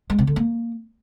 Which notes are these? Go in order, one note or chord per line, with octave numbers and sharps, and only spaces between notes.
G#3
C3
D3
A#3